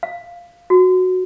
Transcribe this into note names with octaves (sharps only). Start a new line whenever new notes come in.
F5
F#4